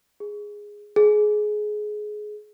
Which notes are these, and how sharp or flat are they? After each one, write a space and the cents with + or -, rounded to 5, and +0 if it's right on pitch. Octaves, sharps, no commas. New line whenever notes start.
G#4 -5
G#4 +20